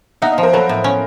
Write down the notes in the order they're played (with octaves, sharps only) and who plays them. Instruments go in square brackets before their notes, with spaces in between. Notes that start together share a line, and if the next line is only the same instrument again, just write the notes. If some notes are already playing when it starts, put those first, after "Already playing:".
[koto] D#4 [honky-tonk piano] E5 F#5
[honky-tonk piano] D#5 F5
[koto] F3
[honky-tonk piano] A#4 C5
[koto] F#3 [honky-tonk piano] A4 B4
[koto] A2
C#4